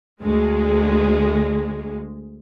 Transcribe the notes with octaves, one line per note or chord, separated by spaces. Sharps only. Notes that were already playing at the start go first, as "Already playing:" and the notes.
D2 G#3